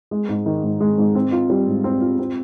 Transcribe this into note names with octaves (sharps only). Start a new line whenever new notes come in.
G#3
G#2
D#3
G#2
G#3
G#2
C4
F4
G3
G#2
C4
F4
C4